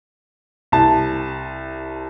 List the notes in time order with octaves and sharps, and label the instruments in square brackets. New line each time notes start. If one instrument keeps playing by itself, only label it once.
[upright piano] C2 A5